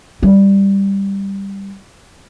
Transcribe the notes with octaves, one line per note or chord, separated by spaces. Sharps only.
G3 E4